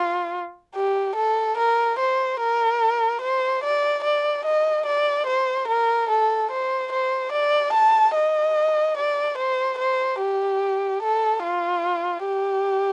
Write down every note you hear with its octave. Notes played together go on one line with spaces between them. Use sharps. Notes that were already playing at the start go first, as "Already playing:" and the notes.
Already playing: F4
G4
A4
A#4
C5
A#4
C5
D5
D5
D#5
D5
C5
A#4
A4
C5
C5
D5
A5
D#5
D5
C5
C5
G4
A4
F4
G4